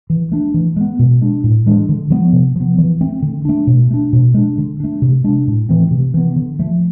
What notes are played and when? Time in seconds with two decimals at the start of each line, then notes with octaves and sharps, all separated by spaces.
0.10 E3
0.32 A3 D4
0.54 E3
0.76 G#3 B3
0.99 B2
1.22 G#3 D4
1.44 A2
1.66 E3 G#3 D4
1.89 D3
2.10 F3 G#3 B3
2.33 C3
2.56 F3 B3
2.78 E3
3.01 A3 C4
3.22 D3
3.45 A3 D4
3.67 B2
3.91 A3 D4
4.13 B2
4.34 G#3 D4
4.58 D3
4.80 A3 D4
5.02 C3
5.24 G#3 D4
5.47 A2
5.69 E3 A3 C4
5.91 C3
6.14 E3 B3
6.36 D3
6.59 F3 A3